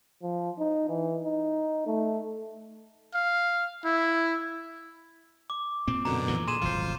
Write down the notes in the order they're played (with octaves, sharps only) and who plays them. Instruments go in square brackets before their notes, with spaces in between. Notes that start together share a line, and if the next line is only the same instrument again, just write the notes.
[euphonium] F3
D#4
E3
D#4
A3
[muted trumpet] F5
E4
[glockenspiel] D6
[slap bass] A#2 C4
[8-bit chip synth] F#2 B2 D3 [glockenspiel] A#5
[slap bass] A#2 E3 F3
[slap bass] A#2 [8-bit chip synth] G#4 [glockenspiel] C6 D#7 E7
[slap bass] D#1 G#1 F#3 [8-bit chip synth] F4 C5